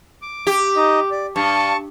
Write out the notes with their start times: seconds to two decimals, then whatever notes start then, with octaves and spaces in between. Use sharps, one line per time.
0.22 D6
0.47 G4
0.76 D#4 D#5
1.11 D5
1.36 G2 A5 C#6